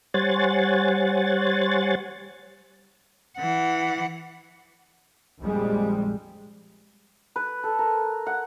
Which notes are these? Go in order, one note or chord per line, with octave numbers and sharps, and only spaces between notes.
G3 C5 C#5 F#5 G#5 A6
E3 F#5
A#1 F2 G3 G#3
B4
A4
A#4
F#5